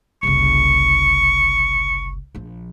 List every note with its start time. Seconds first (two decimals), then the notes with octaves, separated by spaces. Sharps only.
0.23 F#1 C2 C#6
2.35 A#1 F3